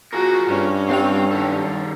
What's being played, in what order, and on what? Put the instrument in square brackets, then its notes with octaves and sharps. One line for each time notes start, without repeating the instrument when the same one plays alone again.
[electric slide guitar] F4 G#4 A#4 [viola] F#4
[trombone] G2 [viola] C#4
[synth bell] G3 G4 F7 [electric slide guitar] C4 G5
[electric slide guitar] D#3 A4